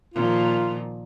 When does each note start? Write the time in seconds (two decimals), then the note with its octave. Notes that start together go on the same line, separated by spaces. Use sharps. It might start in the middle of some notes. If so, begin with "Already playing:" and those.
0.14 A#2 D#3 F3 F4